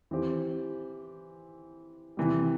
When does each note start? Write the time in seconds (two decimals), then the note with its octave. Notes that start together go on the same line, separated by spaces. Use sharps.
0.11 E3 C4 G4 C5
2.17 C3 E3 G3